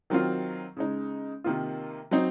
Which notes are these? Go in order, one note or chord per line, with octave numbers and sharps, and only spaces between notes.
D#3 F#3 C4 F4
C#3 G#3 D#4
C3 D#3 A#3 F4
F#3 C4 D#4